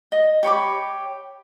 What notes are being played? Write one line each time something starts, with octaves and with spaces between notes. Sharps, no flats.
D#5
G4 C#5 B5 D6